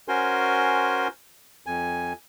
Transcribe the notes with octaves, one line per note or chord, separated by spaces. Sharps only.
C#4 F#4 A#4 C5 G#5 C6
F2 G#5